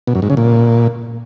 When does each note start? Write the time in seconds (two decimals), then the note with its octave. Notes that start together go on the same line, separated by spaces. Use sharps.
0.07 B2
0.15 F#2
0.22 G#2
0.30 C#3
0.37 A#2